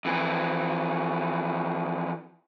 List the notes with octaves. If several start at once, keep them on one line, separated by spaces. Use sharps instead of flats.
F2 E3